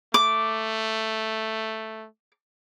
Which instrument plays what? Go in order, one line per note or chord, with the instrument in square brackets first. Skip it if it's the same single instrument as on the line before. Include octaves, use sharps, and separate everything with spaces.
[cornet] A3 [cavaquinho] D6